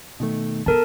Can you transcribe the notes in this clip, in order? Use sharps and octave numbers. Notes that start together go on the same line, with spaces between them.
B2 D#3 A3
B3 A4 A#4 A5